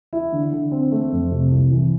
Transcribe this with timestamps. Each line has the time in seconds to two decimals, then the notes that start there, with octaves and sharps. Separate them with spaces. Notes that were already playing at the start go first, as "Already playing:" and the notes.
0.13 E4
0.32 D3
0.53 D3
0.72 C4
0.92 A3
1.12 F2
1.31 C3
1.51 C2
1.71 E3